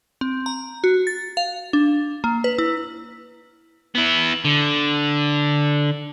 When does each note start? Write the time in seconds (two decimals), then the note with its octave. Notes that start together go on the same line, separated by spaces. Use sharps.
0.21 C4
0.46 A#5
0.84 F#4
1.07 A6
1.37 F5
1.73 D4
2.24 A#3
2.44 B4
2.58 E4
3.95 B3 E4
4.45 D3